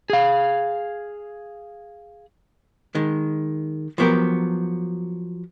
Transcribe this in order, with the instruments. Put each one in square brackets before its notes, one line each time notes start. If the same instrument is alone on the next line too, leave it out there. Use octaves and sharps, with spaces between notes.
[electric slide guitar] G#4 F5
[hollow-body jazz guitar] D#3 G#3
F3 F#3 B3 G4 A#4